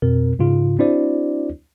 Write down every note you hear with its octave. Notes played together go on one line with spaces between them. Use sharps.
F2 B2 C4 A#4
G#2 C#3 F4
C4 D4 E4 F#4 C5 D5